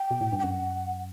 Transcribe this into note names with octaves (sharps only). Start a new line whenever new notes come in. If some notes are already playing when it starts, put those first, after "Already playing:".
Already playing: G5
B2
A2
G2
G5
F#2 F#5